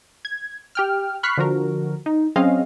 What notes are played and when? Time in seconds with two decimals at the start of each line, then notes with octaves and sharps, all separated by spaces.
0.25 G#6
0.75 G4 G5 F6
1.23 B5 C#6 F6 F#6 B6 C7
1.37 D3 F3 F#4 A#4
2.06 D#4
2.36 F#3 C4 C#4 G#4 D#5 F5